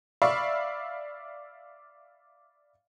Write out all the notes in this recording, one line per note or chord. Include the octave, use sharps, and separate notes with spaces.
D5 E5 F5 B5 C#6 E6